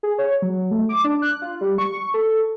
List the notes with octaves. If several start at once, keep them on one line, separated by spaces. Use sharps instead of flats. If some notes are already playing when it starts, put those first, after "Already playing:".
G#4
C#5
F#3
A3
D6
D4
F#6
F4
G3
C#6
A4